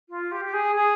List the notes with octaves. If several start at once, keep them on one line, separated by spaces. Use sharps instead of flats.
F4
G4
G4
G#4
G#4